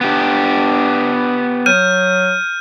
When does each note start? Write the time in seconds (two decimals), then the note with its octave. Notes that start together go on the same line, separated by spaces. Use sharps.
0.01 B3 D4 G4
1.66 F#3 F6 G6 D#7